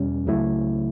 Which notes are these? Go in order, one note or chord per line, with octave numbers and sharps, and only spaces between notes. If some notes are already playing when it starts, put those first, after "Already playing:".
Already playing: E2 B2 G3 C#4
C#2 C#3 F#3 A3 E4